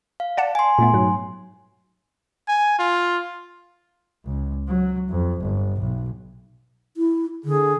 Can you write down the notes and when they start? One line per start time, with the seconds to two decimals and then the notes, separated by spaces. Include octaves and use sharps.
0.20 F5
0.37 D5 F#5 A5
0.55 G#5 C6
0.79 A#2 A3 B3
0.94 G#2 B2 F#3
2.48 G#5
2.79 F4
4.25 C#2
4.68 F#3
5.10 F2
5.40 G1
5.80 B1
6.97 E4
7.45 D3 G#4